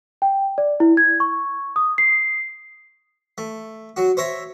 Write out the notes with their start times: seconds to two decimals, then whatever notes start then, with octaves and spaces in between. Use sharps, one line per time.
0.22 G5
0.58 D5
0.80 E4
0.97 G#6
1.20 C#6
1.76 D#6
1.98 C7
3.38 A3
3.97 F#3 F#4
4.17 C5 C#5 E5 A#5